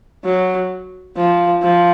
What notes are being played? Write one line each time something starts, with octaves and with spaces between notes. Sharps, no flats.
F#3
F3
F3